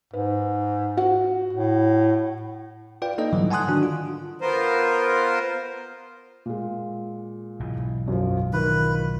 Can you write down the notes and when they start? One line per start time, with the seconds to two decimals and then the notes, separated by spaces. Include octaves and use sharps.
0.13 G#2 B4
0.97 F#4
1.53 A2
3.02 F4 B4 D5 F5 G5
3.18 A#3 D#4 A4 D#5
3.33 G#2 D3 E3 F#3 G3
3.50 F#5 G#5 A5 C6 D#6 F#6
3.68 D3 D#3 D4 F#4
3.83 F4
4.41 B3 F4 A#4 C5
6.46 A#2 G#3
7.60 B1 G#2 E3
8.08 F#2 F3
8.53 D#3 F4 A#4 B4